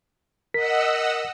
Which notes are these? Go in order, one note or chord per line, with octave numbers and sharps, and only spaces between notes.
A#4 D#5 F#5 E6 B6